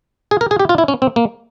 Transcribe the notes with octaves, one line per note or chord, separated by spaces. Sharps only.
G#4
A#4
G#4
G4
F4
E4
C#4
C4
A#3